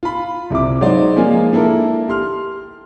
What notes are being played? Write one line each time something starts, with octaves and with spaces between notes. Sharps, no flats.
F4 B5
C2 C3 E4 D6
F#3 G#3 D#4 C5 D5 D#5
F3 G#3 A#3 F4 G#5
A#3 D4 E4 A4 A#4
G4 C6 F6